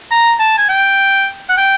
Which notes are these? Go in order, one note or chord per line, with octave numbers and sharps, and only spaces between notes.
A#5
A5
G#5
G5
F#5
G5